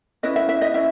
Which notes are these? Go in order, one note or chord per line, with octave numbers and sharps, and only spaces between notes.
C#4 E4 B4 D#5
E5
E5
D#5
C#4 E4 E5